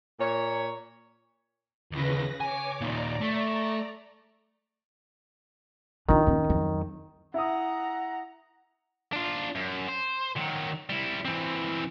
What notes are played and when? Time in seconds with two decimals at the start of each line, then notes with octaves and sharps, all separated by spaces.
0.20 A#2 C#5
1.92 D#2 C#3 E3 B4 A#6
2.40 C#5 G#5 D6
2.81 D#2 A#2 D5 A#5
3.21 A3
6.09 D#3 D4 F4
6.27 A#3 C#4
6.50 F2 F#3
7.34 E4 F#5 A#5 D#6
9.13 D4 F4
9.56 F#2
9.89 C5
10.36 D#3 F#3
10.90 G3 E4
11.25 E3 C4